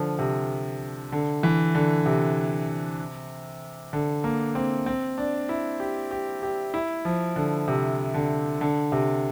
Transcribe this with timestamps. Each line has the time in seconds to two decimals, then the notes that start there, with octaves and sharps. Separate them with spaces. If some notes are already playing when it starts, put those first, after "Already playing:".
Already playing: D3 F3
0.19 C3
1.12 D3
1.43 E3
1.75 D3
2.06 C3
3.93 D3
4.24 A#3
4.55 C4
4.86 C4
5.18 D4
5.49 E4
5.80 G4
6.11 G4
6.43 G4
6.74 E4
7.05 F3
7.36 D3
7.68 C3
8.14 D3
8.61 D3
8.92 C3